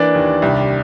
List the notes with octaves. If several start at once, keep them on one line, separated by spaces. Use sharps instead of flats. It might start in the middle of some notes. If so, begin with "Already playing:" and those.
Already playing: E3 A#3 D4 D5
D#2
C2